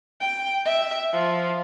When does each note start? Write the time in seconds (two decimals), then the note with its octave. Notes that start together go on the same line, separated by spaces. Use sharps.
0.21 G5
0.65 E5
1.13 F3